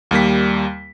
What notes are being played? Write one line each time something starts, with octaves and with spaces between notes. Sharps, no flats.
D#2 G3 A#3 B6